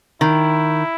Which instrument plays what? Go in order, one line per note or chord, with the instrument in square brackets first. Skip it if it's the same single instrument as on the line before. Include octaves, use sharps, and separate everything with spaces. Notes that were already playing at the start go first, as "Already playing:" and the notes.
[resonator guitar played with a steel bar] D#3 [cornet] E4